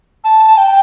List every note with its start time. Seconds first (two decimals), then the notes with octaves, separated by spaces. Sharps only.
0.24 A5
0.57 G5